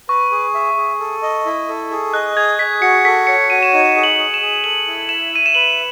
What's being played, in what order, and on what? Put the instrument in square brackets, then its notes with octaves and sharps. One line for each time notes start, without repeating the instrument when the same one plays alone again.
[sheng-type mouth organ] B4 [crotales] C#6
[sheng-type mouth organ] G#4
E5
G#4
A4
D#5
E4
A4
G#4
[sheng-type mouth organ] D#5 [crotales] F#6
[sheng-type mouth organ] G#4 [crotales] G#6
[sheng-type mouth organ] G#4 [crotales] B6
[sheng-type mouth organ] F#4 [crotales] C#7
[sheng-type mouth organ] A4 [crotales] B6
[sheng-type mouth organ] C#5 [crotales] C#7
[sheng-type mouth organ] F#4 [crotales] D#7
[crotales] E7
[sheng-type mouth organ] D#4 [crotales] D#7
[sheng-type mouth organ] G#4
[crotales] F#7
[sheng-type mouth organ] G#4
[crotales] E7
[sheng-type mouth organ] G#4
[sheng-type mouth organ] A4 [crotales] F#7
[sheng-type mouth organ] E4
[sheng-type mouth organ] E5 [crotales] E7
[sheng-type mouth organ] E5 [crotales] D#7
[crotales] E7
[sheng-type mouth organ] B4 [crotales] F#7